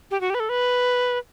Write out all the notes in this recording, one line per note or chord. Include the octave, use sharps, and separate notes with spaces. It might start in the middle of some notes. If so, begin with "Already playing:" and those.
G4
F#4
G4
B4
A4
B4